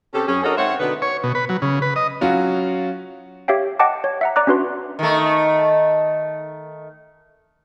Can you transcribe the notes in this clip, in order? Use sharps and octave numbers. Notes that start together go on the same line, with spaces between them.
C3 C4 C#4 G4 A4
F#2 C#4 G#4
D4 F#4 A4 A#4 C#5 D#5
G#2 C4 C5 C#5 E5 F#5
B2 D3 B3 D#4 B4
C#5
B2
B4
F#3
C#3
B4
D#5
F#3 C#4 F4 F#4
G4 C#5 E5 F5 G5
D#5 F#5 G5 A5 D6
C#5
E5 F#5 A#5
D5 A#5 D6 F#6
C#4 D4 F#4 B4 C6
D#3 A3